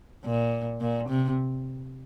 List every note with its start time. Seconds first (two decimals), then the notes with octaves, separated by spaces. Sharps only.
0.25 A#2
0.81 A#2
1.09 C3